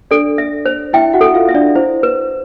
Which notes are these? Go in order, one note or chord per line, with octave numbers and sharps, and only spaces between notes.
D4 A4 D5
E5
C5
E4 E5 G5
F#4 F#5
A4
F4 F5
E5
D4 D5
E4 C5
B4